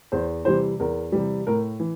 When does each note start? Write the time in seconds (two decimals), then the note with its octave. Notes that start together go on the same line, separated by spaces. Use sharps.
0.12 E2 C5
0.45 C3 E3 G3 C5
0.80 E2 A#4
1.12 C3 E3 G3
1.47 A2 A#4
1.80 E3